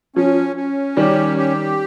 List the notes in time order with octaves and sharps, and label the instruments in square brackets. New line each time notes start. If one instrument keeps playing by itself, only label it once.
[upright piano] F3 [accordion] C#4
[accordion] C#4
[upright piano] D#3 G3 [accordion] G4
[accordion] G4